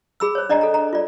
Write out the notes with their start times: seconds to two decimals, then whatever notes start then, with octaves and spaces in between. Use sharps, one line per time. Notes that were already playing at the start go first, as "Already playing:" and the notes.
0.20 G#4 B5 E6
0.35 C5 C#5
0.49 D4 D5 D#5 A#5
0.61 A4 A#5
0.74 A#5
0.93 F4 D5